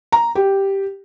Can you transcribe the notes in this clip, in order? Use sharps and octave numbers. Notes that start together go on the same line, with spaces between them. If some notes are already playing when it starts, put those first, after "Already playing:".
A#5
G4